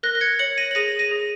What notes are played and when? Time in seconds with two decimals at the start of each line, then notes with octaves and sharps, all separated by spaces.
0.03 A#4 F#6 A#6
0.15 A#6
0.21 G#6 C#7
0.39 C#5 C#7 F#7
0.57 A#6 D#7
0.71 F#7
0.75 G#4 A#6 D#7
0.99 A#6 D#7
1.11 G#4